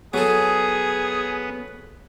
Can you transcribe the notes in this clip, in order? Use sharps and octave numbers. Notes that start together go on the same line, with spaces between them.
F#3 B3 G#4 A4